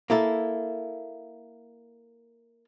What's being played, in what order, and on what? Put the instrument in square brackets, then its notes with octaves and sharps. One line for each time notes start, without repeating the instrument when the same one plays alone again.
[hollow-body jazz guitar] A#3 E4 A4